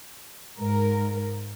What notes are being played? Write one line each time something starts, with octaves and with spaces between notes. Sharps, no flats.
G#2 A#4